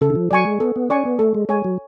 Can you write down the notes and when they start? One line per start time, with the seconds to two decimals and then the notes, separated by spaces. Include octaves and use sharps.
0.01 C#3 A4
0.10 D3
0.15 F3
0.31 F#3 D5 G#5 C#6
0.45 G#3
0.60 B3 A4
0.76 B3
0.90 C#4 D5 G#5 C#6
1.05 B3
1.19 A3 A4
1.35 G#3
1.49 G#3 C#5 G#5
1.64 F#3